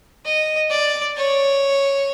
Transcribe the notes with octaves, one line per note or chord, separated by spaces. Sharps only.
D#5
D5
C#5